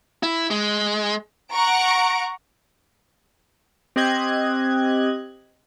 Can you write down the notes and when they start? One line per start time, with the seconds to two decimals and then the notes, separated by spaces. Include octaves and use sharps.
0.23 E4
0.51 G#3
1.52 F#5 A#5 C#6 D7
3.96 C4 G4 D#5 F#6 G#6